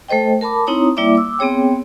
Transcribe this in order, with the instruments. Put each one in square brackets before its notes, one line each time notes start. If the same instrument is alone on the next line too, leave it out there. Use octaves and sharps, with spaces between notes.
[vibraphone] A3 A4 C5 D#5 G5
A#4 A5 B5 D6
C4 D#4 E4 C#5 A#5 D#6
G3 A#3 E4 D5 E5 D6
D6 E6
B3 C4 G#4 C#5 G5